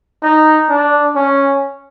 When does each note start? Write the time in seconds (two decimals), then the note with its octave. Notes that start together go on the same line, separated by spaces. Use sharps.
0.23 D#4
0.69 D4
1.16 C#4